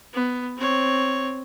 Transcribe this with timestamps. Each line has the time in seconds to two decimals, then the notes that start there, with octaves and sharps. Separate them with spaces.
0.14 B3
0.57 C4 C#5